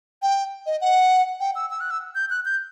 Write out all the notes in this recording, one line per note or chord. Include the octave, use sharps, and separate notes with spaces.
G5
D#5
F#5
G5
E6
E6
F#6
E6
G6
F#6
G6